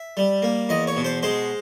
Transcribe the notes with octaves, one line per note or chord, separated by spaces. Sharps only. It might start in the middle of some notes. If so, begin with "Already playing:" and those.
Already playing: E5
G3
A#3
E2 D#5
C#5
B2
C5
G#3 C5